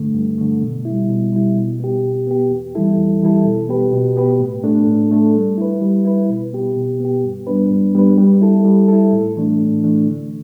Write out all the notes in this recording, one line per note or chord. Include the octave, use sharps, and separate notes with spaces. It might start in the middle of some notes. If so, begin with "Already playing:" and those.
Already playing: G2 D3 A3
G2
D3 A3
B2
E4
G3
B2
G3 E4
B2
B3 G4
B2
B3 G4
E2
E3 G3 E4 A4
E2
E3 G3 E4 A4
B2
B3 G4 B4
B2
B3 G4 B4
A2
A3 D4 A4
A2
A3 D4 A4
G3
E4 B4
G3
E4 B4
B2
B3 G4
B2
B3 G4
G2
G3 B3 D4 B4
G2
G3 B3 D4 B4
G3
E4 A4
G3
E4 A4
A2
E3 A3 D4
A2
E3 A3 D4
D3